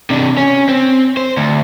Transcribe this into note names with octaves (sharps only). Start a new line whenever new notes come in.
C3 D4
C#4
C4
C5
D2